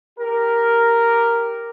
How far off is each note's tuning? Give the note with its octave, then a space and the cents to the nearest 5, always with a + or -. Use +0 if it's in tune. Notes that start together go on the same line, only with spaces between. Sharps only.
G4 +0 A#4 +0